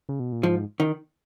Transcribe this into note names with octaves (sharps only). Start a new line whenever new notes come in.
C#3
B2
A#2
G#2 F3
D#3